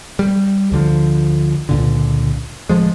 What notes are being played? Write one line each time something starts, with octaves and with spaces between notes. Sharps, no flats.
G3
D2 D3 F3
C#2 A#2 D3
D1 D2 F3 G#3